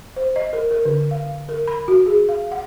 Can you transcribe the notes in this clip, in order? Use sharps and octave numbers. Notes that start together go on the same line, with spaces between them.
C5
D#5
A#4
A#4
D3
F5
A#4
B5
F#4
G#4
F5
F#5